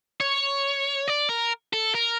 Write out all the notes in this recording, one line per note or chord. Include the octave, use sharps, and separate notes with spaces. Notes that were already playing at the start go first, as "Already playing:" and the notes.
C#5
D5
A#4
A4
A#4